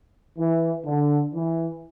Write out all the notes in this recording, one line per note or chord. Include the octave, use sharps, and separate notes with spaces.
E3
D3
E3